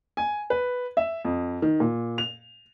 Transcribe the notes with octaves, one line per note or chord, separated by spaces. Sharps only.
G#5
B4
E5
F2
D#3
A#2
F7